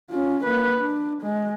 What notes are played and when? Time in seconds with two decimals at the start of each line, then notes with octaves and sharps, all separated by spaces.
0.10 C#4 F4
0.44 A#3 B4
0.81 D4
1.22 G#3